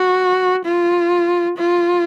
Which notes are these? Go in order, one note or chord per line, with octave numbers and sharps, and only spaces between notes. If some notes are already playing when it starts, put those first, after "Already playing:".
Already playing: F#4
F4
F4